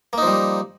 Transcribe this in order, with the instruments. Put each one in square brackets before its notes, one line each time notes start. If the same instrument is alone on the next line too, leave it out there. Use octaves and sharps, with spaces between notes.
[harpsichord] A#3
D#4
F3
G3